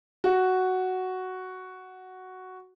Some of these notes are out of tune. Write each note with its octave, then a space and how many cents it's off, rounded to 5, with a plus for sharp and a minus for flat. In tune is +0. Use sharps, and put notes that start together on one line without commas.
F#4 +5